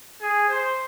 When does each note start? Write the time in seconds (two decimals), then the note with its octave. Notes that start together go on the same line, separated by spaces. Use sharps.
0.21 G#4
0.49 C5